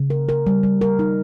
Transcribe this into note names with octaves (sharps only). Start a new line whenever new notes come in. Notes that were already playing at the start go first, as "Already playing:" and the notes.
Already playing: C#3
A#4
A#4
G3
G3
A#4
D#4